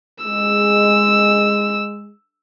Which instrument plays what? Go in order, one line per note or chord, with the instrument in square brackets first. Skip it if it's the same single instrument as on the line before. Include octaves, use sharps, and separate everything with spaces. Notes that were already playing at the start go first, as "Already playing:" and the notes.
[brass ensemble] G#3 [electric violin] E6